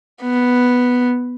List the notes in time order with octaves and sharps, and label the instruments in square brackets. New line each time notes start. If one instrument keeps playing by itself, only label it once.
[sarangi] B3